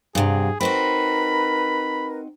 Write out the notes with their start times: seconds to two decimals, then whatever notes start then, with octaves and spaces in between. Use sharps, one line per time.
0.15 G2 C3 G#4 F5 F#5
0.61 C4 D#4 F#4 A#4 B4 B5